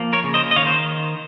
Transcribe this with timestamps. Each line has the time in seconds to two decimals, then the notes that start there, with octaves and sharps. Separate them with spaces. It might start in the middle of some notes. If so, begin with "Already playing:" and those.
Already playing: F3 A#3
0.13 A#4 C#5
0.24 C#3
0.34 C5 D#5
0.51 D#5
0.56 D#3 C#5 F5
0.67 C5